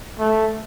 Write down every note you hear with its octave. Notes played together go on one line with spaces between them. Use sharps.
A3